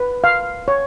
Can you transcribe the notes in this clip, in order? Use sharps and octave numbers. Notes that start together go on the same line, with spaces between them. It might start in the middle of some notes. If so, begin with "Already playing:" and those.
Already playing: B4
F5
C#5